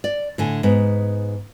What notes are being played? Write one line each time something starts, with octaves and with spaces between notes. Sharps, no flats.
D5
A2 D3 G#5
G#2 B3